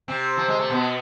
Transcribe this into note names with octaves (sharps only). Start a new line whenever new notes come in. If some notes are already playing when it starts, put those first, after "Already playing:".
C3 C4
F3
G#3
A3
B2 B3